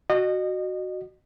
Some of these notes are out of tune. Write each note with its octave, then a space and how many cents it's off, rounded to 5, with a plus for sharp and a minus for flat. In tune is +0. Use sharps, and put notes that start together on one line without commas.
F#4 +0 D#5 -30